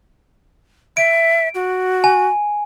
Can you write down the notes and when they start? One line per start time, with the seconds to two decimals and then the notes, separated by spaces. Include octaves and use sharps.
0.97 E5 D7
1.55 F#4
2.04 G#5